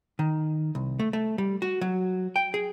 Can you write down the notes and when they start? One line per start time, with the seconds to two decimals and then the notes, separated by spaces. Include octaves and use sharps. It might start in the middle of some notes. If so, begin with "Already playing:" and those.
0.19 D#3
0.75 C2
0.99 A3
1.13 A3
1.38 G3
1.62 F#4
1.81 F#3
2.36 G5
2.54 G#4